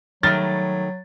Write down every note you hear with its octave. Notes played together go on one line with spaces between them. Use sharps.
D#3 F#3 G3 A3 A6